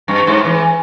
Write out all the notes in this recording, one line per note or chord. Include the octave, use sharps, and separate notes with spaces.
G2
G#2
E3